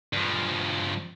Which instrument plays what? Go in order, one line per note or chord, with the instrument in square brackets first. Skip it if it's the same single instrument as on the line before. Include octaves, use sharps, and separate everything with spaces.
[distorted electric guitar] G2 F3